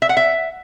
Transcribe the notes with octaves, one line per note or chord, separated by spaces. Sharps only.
E5
F#5
E5